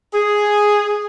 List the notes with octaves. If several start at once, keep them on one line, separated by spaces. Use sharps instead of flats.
G#4